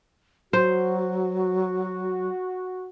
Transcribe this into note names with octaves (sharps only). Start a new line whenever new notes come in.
F#3 F#4 C5